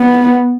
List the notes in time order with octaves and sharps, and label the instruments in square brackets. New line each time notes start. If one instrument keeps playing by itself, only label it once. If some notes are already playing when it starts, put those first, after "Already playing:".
Already playing: [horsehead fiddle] B3